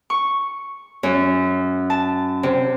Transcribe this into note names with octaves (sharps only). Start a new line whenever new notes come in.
C#6
F#2
A5
C3